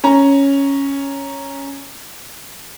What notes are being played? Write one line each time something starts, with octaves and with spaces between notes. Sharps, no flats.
C#4 A#5